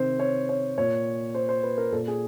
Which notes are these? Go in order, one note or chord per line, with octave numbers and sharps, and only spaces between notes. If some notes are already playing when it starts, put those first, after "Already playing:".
Already playing: C3 D#3 C5
C#5
C#5
A#2 C#5
C5
C5
B4
A#4
A#2 A4
G#4